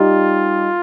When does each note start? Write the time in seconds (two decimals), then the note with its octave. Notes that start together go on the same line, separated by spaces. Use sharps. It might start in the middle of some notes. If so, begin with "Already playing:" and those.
Already playing: G3 D#4 F4 G4